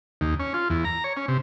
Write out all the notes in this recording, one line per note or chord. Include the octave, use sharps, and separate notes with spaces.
D#2
C#4
F4
E2
A#5
C#5
C#4
C3